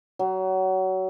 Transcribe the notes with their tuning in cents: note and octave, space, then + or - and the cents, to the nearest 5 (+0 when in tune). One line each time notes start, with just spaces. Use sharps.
F#3 +25